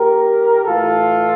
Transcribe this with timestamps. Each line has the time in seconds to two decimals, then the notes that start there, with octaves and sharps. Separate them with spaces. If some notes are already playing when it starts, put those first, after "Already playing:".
Already playing: A#2 G4 A#4
0.66 A2 E3 F4 A4